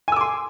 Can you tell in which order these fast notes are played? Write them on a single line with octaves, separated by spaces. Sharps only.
G#5 E6 D6 C6